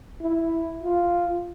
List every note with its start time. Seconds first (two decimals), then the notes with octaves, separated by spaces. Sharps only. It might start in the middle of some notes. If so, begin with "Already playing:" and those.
0.22 E4
0.83 F4